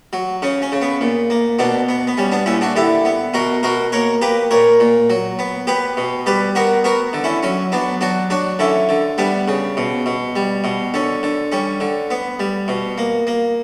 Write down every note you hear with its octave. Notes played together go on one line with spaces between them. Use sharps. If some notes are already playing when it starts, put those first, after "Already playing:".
F#3
C#3 C#4
C#4
C#3
B3
A#2
A#3
B2 B3 D4
B3
B3
G3 C#4
B3 D4
A#2 C#4 E4
D4 F#4
D3 E4 G4
B3
B2 F#4 A#4
B2 F#4 A#4
A#3 A#4 C#5
A#3 G4 B4
A#2 A#4 C#5
A#2
F#3
B3
B3 G4 B4
B2
G3 G4 B4
B3 F#4 A#4
B3 F#4 A#4
D3
C#4 E4
F#3 C#4
F#3 B3 D4
F#3 D4 F#4
F#3 D4 F#4
D3 C#4 E4
D3
G3 B3 D4
C#3
B2
B2
G3
B2
D3 C#4
D3
G3 C#4
D3
B3
G3
B2
A#3
A#3